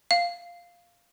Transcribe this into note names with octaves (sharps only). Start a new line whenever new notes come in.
F5